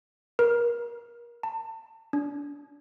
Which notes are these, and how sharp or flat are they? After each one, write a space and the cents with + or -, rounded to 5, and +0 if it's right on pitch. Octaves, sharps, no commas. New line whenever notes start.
A#4 +30
A5 +35
D4 -30